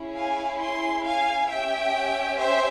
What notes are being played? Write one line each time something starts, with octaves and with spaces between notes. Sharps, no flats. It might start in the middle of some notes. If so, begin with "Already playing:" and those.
Already playing: C#4 E4 G#4
F5 G#5
G#5 C6
F5 G#5
C#4 G4 E5 G5
C5 E5